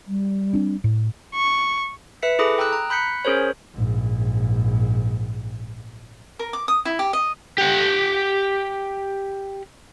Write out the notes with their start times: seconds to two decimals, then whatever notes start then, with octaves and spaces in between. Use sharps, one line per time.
0.07 G3
0.53 C4 D4
0.84 A2
1.35 C#6
2.22 B4 E5 B6 C#7
2.39 E4 G#4 A4 B5 D6 D#6
2.58 G5 A#5 D#6 E6 F#6
2.73 A#5
2.90 B5 F#6 G6 B6 C#7
3.25 C#4 G#4 A#4 C5 C#5
3.75 A#1 G#2
6.39 A#4
6.53 D6
6.68 D#6
6.85 E4
6.99 G4
7.13 D#5
7.58 G4 F#5